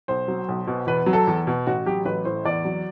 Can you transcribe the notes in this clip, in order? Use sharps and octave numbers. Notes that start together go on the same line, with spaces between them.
B1 C5
F#3
B1
B2
E2 B4
F#3
A4
E2
B2
A1 F#4
F#3 G4
A1 B4
A2 C5
E2 D5
F#3